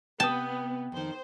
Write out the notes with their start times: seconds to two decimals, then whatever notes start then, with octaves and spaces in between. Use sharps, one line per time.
0.20 C3 B3 G5 A5 D#6
0.92 F2 D#3 C5